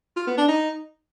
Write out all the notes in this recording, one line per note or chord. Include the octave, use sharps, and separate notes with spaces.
F4
B3
D4
D#4